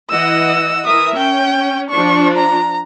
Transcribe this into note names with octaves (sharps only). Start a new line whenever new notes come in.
E3 D#5 F#5 E6
E3 A#4 E5 D#6
C#4 G5
F3 D4 C#6
A#5